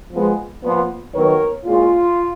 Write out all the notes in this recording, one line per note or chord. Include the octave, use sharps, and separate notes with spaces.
F3 G#3 B3
A#2 F3 B3
D#3 F#3 B3 A#4 C#5
A#2 G#3 C#4 F4